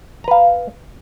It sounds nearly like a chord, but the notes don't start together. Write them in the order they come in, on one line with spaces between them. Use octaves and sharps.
A#5 B4 F5